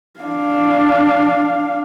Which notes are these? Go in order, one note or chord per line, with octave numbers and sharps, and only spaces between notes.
D4 F5